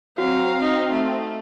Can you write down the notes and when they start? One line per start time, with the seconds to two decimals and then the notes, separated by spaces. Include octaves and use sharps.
0.18 F#3 C4 F#4 F5 A#5
0.60 D#4
0.91 A3